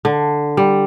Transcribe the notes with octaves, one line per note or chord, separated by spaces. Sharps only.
D3
G3